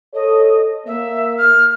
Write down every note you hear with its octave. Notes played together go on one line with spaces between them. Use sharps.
A4 C#5 D#5
A#3 E5
F6